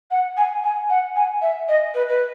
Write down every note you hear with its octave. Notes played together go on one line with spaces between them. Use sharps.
F#5
G#5
G#5
F#5
G#5
E5
D#5
B4
B4